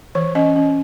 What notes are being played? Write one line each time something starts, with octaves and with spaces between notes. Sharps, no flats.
E3 C#5
C#4 D#5
C#4